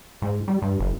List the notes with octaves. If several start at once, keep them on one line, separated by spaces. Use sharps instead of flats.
G#2
G3
G2
F#1